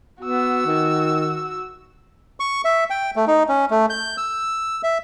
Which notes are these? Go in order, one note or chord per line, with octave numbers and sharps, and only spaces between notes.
B3 F#4 E6
D#3
C#6
E5
G5
A3
D#4
C#4
A3
G6
E6
E5